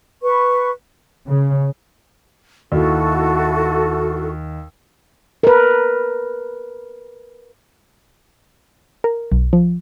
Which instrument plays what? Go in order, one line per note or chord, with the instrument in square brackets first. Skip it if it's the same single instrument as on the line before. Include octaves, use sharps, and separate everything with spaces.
[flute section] B4 C#6
[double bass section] C#3
[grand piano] D#2 [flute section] E4 F#4 A4
[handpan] A#4 B4
[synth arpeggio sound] A#4
B1
F3